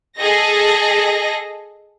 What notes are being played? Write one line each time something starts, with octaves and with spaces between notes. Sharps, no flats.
G#4 A4 D#5 A#6